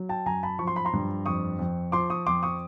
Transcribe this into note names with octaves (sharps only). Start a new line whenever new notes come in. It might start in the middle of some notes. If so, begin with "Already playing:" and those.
Already playing: F#3
G5 A5
F#2 G#5 A#5
A5 B5
F3 C#6
C6
B5
A#5 C6
G2
F2 C#6 D#6
F2
F3 C6 D6
C#6 D#6
F2 C6 D6
C#6 D#6